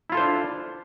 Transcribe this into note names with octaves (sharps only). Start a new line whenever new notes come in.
D4 E4 F4 A4 C5